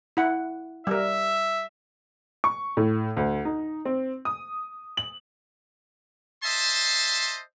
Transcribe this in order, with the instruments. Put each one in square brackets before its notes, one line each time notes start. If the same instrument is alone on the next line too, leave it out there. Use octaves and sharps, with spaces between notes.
[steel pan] E4 F#5
[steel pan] G3 A#4 [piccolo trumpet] E5
[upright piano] C#6
A2
D2
D#4
C4
D#6
F#7
[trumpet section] C5 D#5 E5 A5 C6